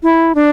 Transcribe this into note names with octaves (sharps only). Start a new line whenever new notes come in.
E4
D4